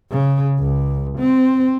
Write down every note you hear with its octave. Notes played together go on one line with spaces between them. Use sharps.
C#3
C#2
C4